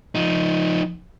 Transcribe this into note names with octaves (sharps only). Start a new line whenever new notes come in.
F3 D#4